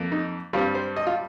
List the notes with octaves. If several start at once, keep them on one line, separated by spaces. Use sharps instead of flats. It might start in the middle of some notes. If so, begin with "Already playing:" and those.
Already playing: F2 A#3
D#4
G2 G3 C4 F4
C5
D#5
F4